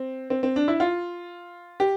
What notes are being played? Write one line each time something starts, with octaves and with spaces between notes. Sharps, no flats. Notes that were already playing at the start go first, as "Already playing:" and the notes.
Already playing: C4
C4
C4
D4
E4
F4
G4